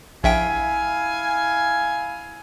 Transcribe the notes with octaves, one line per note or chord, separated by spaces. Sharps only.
A#1 E4 E5 F5 G5 G#5